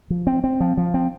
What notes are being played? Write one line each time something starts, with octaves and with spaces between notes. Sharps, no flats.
F3
C4
C4
F3
F3
C4